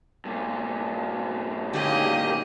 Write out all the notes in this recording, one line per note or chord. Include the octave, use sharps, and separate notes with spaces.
G2 A#2
D3 D#3 A#3 C#4 G4 G#4 D#5